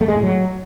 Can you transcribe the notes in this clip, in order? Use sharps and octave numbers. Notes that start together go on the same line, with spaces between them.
A3
G#3
A2
F#3